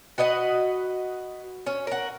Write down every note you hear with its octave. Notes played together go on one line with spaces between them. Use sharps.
F#4 B4 D#5 F#5
C#4 C#5
A#4 F#5